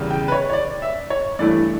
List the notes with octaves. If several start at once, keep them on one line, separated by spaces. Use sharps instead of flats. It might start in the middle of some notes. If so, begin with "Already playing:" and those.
Already playing: E2 C#3 G3
G5
B4
C#5
C#5
D5
E5
C#5
G2 E3 A3 E4 D5